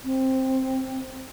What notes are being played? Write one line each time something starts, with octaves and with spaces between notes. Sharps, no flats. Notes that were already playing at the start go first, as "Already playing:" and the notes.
C4